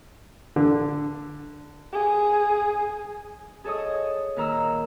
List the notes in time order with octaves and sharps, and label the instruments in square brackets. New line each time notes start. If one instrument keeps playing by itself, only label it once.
[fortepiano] D3
[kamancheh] G#4
[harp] G#4 A4 C#5 D#5 D#6
A#2 D#3 A#4 A#5 E6